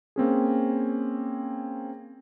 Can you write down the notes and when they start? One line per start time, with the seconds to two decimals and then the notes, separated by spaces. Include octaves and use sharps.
0.16 A#3 C4 C#4 G#4